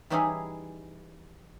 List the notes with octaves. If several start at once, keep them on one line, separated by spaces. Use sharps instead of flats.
E3 G3 C#4 D#4 E4 G#4